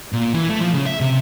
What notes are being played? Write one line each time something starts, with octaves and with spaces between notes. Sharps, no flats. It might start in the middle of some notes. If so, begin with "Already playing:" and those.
A#2
E3
A3
F3
C#3
E5
C3